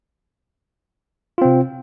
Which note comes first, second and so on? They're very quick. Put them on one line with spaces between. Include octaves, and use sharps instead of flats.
F4 C4 C3